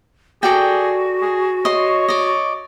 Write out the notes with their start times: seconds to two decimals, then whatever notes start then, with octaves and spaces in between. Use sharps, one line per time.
0.43 F#4 G#4 A4 D5 G5
1.22 G#4
1.65 C#5 D#5 C6
2.08 D5 D#5